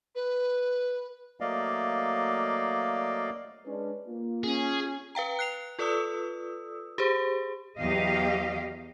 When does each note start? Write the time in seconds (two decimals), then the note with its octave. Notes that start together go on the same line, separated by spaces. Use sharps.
0.15 B4
1.41 F#3 A3 A#3 D5 D#5 F5
3.67 G#3 C#4 D4 B4
4.07 A#3 F4
4.43 C#4 G#4
5.15 B4 F5 G5 A#5
5.39 F#6 C7 F7
5.79 F4 A4 B4 D5 D#6 E6
6.98 G4 G#4 C5
7.78 E2 F#3 G4 D#5 F5